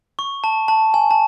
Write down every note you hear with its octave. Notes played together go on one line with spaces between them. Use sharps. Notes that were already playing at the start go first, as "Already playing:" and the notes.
C#6
A5
A5
G#5
A5